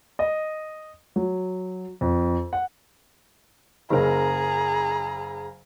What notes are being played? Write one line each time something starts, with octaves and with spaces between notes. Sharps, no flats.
D#5
F#3
F2
F#5
F#1 C#3 G#4 A#4 A#5